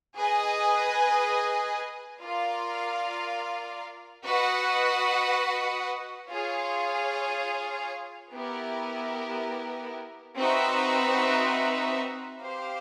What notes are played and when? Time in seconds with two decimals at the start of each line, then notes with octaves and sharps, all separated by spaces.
0.15 G#4 B4 D#5 G#5
2.20 F4 A#4 D5 F5
4.24 F#4 B4 D#5 F#5
6.28 F4 G#4 C#5 F5
8.32 B3 E4 G4 A#4
10.36 C4 D#4 F#4 B4 E5
12.41 G4 C5 F5